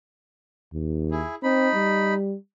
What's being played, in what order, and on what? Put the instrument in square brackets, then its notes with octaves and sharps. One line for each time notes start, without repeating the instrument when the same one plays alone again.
[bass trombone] D#2
[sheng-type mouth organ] E4 G#4
[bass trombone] C4 [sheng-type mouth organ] D#4 B5
[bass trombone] G3